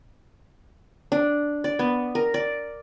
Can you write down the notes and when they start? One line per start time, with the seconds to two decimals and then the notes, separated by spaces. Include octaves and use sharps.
1.12 D4
1.64 D5
1.79 B3
2.15 A#4
2.34 D5